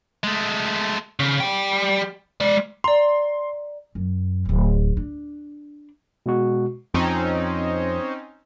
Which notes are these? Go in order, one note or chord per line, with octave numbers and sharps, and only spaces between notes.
G#3 A3
C#3
G3 G5
G#3 D5
D5 A#5 C6
F#2
D1 G#1
D4
B2 G#3 F#4
F2 C4 C#4 D#4